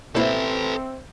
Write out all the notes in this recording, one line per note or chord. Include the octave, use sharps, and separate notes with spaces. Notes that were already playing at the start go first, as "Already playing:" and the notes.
B2 A#3 C4 E4 A4 B4 C5 E5